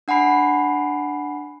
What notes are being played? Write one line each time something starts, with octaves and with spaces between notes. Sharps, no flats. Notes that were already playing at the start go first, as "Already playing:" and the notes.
D4 F#5 G#5 B5 C7